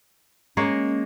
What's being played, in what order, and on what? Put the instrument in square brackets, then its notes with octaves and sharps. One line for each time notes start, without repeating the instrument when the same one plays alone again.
[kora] G#3 A#3 C#5 [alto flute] C#4